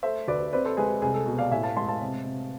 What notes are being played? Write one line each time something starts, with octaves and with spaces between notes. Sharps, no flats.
A3 C5 E5
D2 B4 D5
C4 B4 D5
A4 C5
G#3 G#4 B4
C2 G#4
A4
B2
D5 F5
A2 E5 G#5
F5 A5
G#3 A5 C6
F5 A5
C3
C3